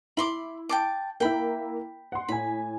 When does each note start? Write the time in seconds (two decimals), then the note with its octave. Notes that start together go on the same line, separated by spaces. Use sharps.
0.17 E4 B5 C6 D6
0.69 G5 A5 D6
1.20 A#3 E4 G5 B5
2.12 F#5 C6
2.28 A2 G#5 B5